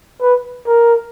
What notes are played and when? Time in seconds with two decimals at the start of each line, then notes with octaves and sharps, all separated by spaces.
0.21 B4
0.67 A#4